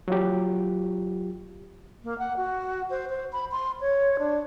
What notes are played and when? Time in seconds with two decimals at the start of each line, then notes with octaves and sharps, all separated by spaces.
0.08 F#3 F4 G4
2.04 A#3
2.19 F#5
2.37 F#4
2.90 C5
3.10 C5
3.33 B5
3.52 C6
3.81 C#5
4.19 D4